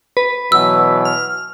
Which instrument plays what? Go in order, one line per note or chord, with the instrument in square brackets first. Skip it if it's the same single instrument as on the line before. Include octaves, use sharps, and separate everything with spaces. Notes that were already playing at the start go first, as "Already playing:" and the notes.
[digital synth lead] B4
[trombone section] B2 E3 F#3 [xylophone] E6
[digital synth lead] F6